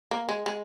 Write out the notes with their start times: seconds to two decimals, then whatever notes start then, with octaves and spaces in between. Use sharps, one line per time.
0.11 A#3
0.29 G#3
0.46 G#3